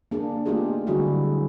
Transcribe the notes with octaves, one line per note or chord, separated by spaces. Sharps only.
A#3 D4 G#4
A3 B3 D#4 F4 G4 G#4
D3 F#3 G3 E4 F#4 G#4